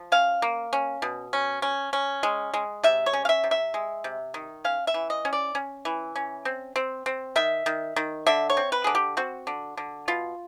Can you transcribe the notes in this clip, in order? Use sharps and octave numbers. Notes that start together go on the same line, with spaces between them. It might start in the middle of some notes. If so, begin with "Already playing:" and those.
Already playing: F3
C#4 F5
A#3
C#4
B2
C#4
C#4
C#4
G#3
G#3
C3 E5
C#5
C#4
F5
E5
C3
E5
G#3
C3
D#3
C#4 F5
E5
E3
D#5
C#4
D5
C#4
E3
C#4
C4
C4
C4
D#3 E5
D#3
D#3
D3 E5
C#5
C4
B4
D3 G#4
G4
C4 F#4
D3
D3
B2 F4